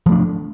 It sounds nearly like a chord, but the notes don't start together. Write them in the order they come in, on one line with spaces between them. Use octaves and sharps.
F3 A3 D4